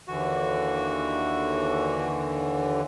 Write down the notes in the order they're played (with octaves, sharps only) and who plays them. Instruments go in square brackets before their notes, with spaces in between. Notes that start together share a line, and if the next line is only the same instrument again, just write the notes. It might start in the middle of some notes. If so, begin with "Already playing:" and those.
[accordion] D#2 D3 E3 [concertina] F#4